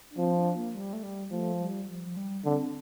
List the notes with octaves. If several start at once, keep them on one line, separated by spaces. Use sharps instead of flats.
D4
F3 C4
D4
A#3
G3
A3
G3
F3 A3
G3
F3
F3
G3
D3 C4